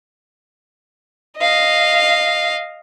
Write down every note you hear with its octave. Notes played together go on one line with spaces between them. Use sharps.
D#5 F5